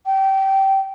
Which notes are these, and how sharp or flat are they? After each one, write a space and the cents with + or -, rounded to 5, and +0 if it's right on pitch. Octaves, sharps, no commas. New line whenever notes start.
G5 -20